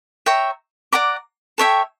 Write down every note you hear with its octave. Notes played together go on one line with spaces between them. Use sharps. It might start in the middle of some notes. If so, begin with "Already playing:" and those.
C#5 E5 G5 A#5
D5 F#5 A#5 D6
A4 C#5 E5 G5